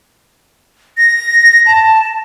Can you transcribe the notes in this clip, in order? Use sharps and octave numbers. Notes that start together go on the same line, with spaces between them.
A#6
A5